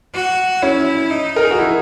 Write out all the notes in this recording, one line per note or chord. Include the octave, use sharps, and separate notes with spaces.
F#4
C#4 E4
D#4
A#4
G#4
F#4
E4